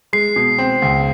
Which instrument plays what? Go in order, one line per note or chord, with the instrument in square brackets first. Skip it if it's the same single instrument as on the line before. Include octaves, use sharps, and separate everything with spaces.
[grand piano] G#3 [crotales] C7
[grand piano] B2
C4
C#2